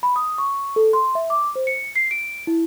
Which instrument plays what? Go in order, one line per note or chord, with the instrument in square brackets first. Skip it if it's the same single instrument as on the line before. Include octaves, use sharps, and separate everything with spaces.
[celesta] B5
D#6
C#6
A4
C6
E5
D6
C5
C#7
C7
D7
E4